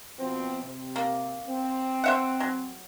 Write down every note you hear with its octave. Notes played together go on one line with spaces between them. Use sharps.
B2 F3 C4
C3
A#3
C4
C5 E5 F#5
F#3